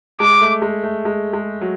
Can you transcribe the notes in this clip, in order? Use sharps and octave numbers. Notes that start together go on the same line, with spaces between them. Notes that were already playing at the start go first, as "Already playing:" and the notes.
G#3 D6
A3
G#3
A3
G#3
G#3
F#3